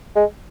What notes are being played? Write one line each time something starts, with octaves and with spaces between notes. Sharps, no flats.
G#3